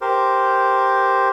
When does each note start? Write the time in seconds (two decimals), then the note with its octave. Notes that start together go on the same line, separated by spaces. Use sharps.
0.01 G4 A#4 C5